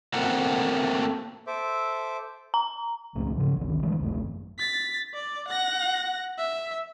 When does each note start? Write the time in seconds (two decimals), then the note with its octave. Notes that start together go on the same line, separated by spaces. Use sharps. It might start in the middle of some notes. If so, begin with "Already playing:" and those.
0.14 A3 A#3 C4 A4 A#4 F#5
1.47 A4 C5 E5 D6
2.54 A#5
3.15 C#2 A#2 A3
3.37 C#3 F3
3.57 G#1 D2 D#3
3.83 D3 E3 G3 G#3
4.00 D1 G#1 F#2 A3
4.58 A6 B6
5.14 D5
5.48 F#5 A#6
6.38 E5